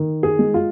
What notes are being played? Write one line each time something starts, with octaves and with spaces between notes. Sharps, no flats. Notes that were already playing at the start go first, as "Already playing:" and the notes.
Already playing: D#3
G#4
G#3
F4